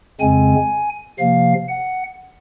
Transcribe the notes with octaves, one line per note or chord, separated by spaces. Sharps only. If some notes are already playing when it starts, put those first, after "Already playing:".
F2 C#3 G#3 C4 G#5
C3 F3 A#3 F5
F#5